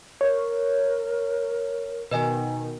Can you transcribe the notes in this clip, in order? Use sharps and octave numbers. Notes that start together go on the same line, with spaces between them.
A#4 C#5
B2 D#3 B4 D#5 G#5